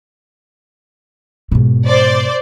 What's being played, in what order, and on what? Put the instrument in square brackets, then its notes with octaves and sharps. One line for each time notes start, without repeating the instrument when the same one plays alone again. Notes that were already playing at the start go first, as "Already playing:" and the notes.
[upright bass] G#2 B2
[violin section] C5 D5